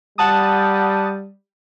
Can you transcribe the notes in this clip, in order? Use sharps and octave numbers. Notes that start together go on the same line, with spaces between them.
G3 F#5 A5 D#6